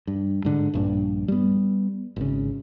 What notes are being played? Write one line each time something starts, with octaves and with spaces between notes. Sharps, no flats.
G2
G#2 D3
A#1 G2 D4
G3 B3
G#1 C#3